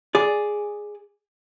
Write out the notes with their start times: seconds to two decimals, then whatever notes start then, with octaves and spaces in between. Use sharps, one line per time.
0.15 G#4 D5